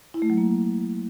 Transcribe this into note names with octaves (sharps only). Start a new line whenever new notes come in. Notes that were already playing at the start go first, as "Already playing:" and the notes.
E4
A3
F#3
A#3